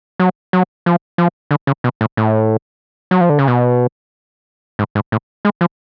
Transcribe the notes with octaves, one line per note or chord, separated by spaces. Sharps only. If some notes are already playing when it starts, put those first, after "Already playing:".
F#3
F#3
F3
F3
D3
C#3
B2
A2
A2
F#3
F3
D3
C#3
B2
G#2
G#2
A2
G#3
F3